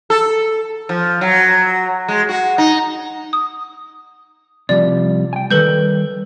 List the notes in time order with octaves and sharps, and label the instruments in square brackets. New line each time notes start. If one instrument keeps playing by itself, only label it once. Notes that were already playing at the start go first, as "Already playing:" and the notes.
[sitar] A4
F3
F#3
G#3
F#4
D#4
[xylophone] D#6
[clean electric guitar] C3 F3 G3 [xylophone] D5
[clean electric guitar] G5 G#5
[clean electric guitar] D#3 G3 [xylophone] A4 B4 G6